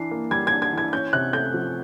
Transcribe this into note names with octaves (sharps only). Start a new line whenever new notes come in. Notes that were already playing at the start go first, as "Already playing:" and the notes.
Already playing: E3 D4 C7
A#3
G3 G#6
G#6
D4
G#6
E3 G#6
C#4 G6
C3 F#6
A3 G6
F3